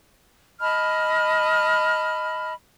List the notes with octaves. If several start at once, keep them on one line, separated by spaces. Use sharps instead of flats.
D#5 A5 B5 F6